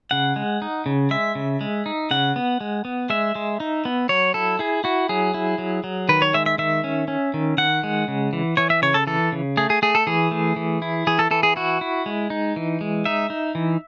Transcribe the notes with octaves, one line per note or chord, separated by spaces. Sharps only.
C#3 F#5
G#3
D#4
C#3
G#3 E5
C#3
G#3
D#4
C#3 F#5
B3
G#3
B3
G#3 E5
G#3
D#4
B3
F#3 C#5
E4 A4
E4 G#4
E4 F#4
F#3 G#4
E4
F#3
F#3
D#3 B4
C#5
G#3 E5
E5
D#3 E5
C#4
C#4
D#3
D#3 F#5
G#3
C#3
E3
E3 C#5
E5
C#3 C#5
A4
E3 A4
C#3
A3 G#4
G#4
A3 G#4
A4
E3 G#4
A3
E3
E4
E3 G#4
A4
E3 A4
G#4
E4 F#4
E4
G#3
D#4
E3
G#3
D#4 E5
D#4
E3